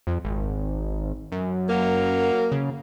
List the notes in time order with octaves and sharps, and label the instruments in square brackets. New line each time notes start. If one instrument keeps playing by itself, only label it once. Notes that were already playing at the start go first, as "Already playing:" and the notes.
[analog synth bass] F2
G#1
F#2
[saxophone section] F#3 A#3
[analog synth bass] C#3